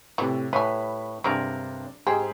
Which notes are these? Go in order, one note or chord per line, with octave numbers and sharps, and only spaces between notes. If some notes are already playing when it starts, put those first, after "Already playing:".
A2 C3 E3
A2 G3 B4 G#5 B5
G2 C3 F#3 G#3 D4 A#4 D5
G#2 C4 G4 G#4